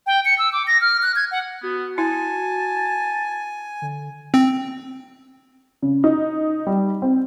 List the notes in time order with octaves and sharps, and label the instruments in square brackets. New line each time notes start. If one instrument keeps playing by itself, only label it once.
[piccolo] G5
C#7
E6
D6
A#6
F6
F#6
G#6
F#5
[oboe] B3 [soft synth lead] F#4
[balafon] E4 [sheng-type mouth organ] G#5 [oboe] A5
[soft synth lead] D3
[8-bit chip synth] C4
[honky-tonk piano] C#3
D#4
G3
C4